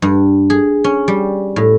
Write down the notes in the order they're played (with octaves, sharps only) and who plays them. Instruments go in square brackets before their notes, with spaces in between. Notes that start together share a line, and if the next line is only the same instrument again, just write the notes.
[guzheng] G2
G#4
C#4
G3
A2